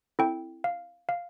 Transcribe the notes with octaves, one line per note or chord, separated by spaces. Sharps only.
C4 E4 A4 G5
F5
F5